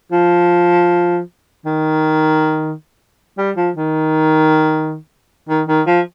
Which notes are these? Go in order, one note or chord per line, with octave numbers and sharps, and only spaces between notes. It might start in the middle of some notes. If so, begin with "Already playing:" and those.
F3
D#3
G3
F3
D#3
D#3
D#3
F3